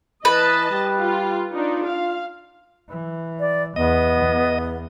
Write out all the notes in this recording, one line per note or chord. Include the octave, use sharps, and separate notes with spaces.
E3 B4 D#5 A5
G3
F4
D4 D#4 F4
F5
E3
D5
E2 B3 D#5
E2